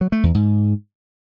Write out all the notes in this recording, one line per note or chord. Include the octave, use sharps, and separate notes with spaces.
F#3
A3
E2
G#2